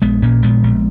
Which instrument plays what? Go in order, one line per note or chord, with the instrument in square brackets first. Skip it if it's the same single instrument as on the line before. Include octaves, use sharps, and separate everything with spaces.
[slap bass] A#1 G#3 B3
A#2 A#3 C#4
A#1 G#3 B3
A#1